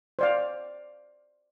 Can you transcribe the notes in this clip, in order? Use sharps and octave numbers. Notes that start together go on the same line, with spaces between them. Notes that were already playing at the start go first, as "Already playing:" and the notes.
C5 D5 F5